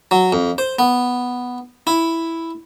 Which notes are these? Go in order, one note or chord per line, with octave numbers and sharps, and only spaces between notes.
F#3
F2
C5
B3
E4